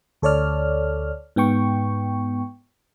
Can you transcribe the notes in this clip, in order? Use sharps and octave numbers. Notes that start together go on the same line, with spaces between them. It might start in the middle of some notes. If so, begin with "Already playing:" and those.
D2 A4 C#5 D5 F6
G#2 B3 G5 C#6